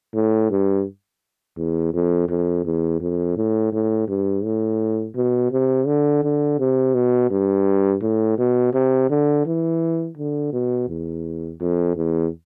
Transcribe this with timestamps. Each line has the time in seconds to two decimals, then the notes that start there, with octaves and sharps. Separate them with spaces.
0.14 A2
0.51 G2
1.57 E2
1.94 F2
2.29 F2
2.65 E2
3.00 F2
3.37 A2
3.72 A2
4.08 G2
4.44 A2
5.15 B2
5.52 C3
5.87 D3
6.23 D3
6.59 C3
6.95 B2
7.31 G2
8.02 A2
8.38 B2
8.74 C3
9.10 D3
9.46 E3
10.17 D3
10.53 B2
10.89 E2
11.60 F2
11.96 E2